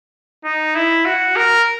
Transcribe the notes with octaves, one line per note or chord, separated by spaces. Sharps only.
D#4
E4
F#4
A#4